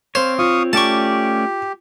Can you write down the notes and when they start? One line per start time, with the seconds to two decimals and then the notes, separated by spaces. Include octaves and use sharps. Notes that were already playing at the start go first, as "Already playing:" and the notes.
0.15 C4 C5 C#5 F5
0.38 F4 F5 C#6 D#6
0.73 A3 C#4 G4 D5 A5 C#6